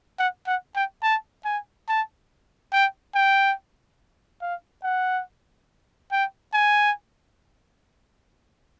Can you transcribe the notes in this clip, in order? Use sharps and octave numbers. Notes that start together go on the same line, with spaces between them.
F#5
F#5
G5
A5
G#5
A5
G5
G5
F5
F#5
G5
G#5